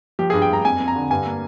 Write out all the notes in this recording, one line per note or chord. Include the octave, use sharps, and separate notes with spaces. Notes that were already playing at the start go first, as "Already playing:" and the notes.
F3 G4
G#4
G2
G5
G2 A#5
F2 G#5
F2
A#5
D3
G2 G#5
A#3